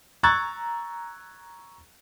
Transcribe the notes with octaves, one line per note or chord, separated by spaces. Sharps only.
A#5 C#6 E6 F#6 G#6 A6